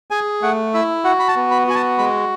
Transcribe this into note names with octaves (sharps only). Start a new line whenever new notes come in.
G#4 G#5
A3 F#5
E4 E5
F#4 F#5
B5
A5
B3
B5
F#4 G#5
A5
G#3 B5